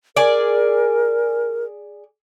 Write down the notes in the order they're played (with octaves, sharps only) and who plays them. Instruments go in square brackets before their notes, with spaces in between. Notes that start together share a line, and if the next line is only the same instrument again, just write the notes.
[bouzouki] G#4 D5 [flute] A#4